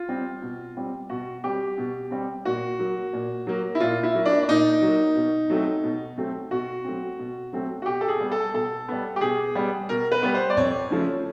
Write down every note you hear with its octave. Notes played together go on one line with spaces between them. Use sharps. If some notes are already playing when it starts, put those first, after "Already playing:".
Already playing: F4
G3 C4
B2
G3 C4
B2 F#4
G3 C4 G4
B2
G3 C4
A#2 F#4
F#3 A#3
A#2
F#3 A#3
E4
A#2 F4
E4
F#3 A#3
D4
D4
A#2 D#4
F#3
A#3
B2
F#3 A3 C4
B2
F#3 A3 C4
B2 F#4
F#3 A3 C4
B2
F#3 A3 C4
F#4
B2 G4
A4
G#4
G3 B3
A4
B2 A4
G3 B3
G4
B2 G#4
G3 B3
B2 A#4
B4
G3 B3
C5
D5
F2 C#5
C#3 F3 A3